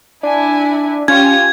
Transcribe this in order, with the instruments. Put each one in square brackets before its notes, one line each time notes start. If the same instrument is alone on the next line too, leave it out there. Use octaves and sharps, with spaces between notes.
[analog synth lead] D4 [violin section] E4 G#5
[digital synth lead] C#4 [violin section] F4 G4 G#5 [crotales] G#6